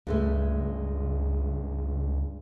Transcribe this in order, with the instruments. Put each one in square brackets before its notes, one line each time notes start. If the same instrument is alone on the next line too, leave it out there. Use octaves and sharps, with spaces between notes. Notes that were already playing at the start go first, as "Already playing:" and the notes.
[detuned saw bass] C#2 [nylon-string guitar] G2 G#3 A3